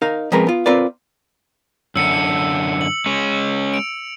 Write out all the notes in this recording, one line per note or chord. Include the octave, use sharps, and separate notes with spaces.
D#4 A#4 F5
F3 G#3 C4 C#4 A#4 B4
B3 F4
C4 F4 A#4 B4 D5
F#2 D3 E6 C#7
F#7
G#3 C#4
D7 F7